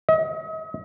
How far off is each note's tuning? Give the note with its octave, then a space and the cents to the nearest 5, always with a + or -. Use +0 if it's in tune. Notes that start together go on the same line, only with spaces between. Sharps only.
D#5 +40